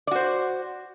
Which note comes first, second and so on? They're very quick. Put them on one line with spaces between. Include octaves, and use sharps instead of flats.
D5 F#4 C5